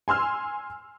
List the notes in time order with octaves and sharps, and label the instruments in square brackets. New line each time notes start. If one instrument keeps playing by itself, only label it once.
[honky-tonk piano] G#5 C6 E6 F6